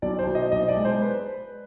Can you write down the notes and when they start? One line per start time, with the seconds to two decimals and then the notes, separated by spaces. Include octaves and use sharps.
0.02 B1 D5
0.19 C5
0.27 B2
0.35 D#5
0.52 B1 D#5
0.68 D5
0.77 G#3
0.85 C5
1.02 B4